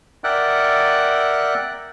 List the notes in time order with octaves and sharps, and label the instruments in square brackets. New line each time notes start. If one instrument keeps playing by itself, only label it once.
[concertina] A#4 D5 E5 F#5 G5 F#6